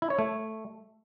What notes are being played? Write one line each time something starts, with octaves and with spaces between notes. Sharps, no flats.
E4
C#5
A3